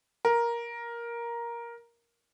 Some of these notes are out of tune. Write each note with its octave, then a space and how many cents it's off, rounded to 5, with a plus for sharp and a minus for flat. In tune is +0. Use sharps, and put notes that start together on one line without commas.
A#4 +10